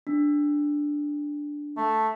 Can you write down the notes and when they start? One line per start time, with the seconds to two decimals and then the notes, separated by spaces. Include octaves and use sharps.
0.07 D4
1.77 A3